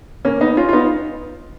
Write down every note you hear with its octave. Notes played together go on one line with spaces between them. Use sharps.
A#3 C#4
B3 D#4
C#4 F4
F4
B3 D#4